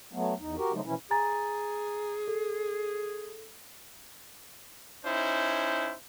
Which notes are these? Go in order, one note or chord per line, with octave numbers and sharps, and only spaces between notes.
F#3 A3 B3
E2 D#4
F#4 G4 A#4
C#3 F3 F#3 G#3 A3 D#4
B2 E3 F3 C#4 E4
G#4 G#5 A#5 A6
A4
C#4 D#4 E4 C5